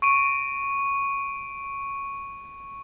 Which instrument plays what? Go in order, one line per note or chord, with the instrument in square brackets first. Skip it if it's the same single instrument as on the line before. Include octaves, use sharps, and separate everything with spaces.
[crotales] C#6 D7 D#7